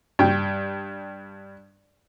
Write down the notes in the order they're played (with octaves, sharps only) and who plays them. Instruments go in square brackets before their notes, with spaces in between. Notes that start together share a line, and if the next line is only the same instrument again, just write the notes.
[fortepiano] G2 G5